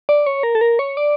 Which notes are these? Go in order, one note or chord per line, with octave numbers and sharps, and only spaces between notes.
D5
C#5
A#4
A4
A#4
C#5
D5